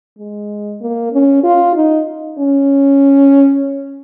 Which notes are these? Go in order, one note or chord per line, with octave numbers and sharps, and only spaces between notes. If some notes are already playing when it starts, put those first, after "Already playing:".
G#3
A#3
C#4
F4
D#4
C#4